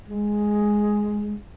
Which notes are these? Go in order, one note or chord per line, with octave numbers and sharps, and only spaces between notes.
G#3